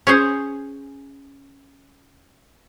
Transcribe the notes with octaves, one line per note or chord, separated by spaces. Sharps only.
C#4 G#4 C5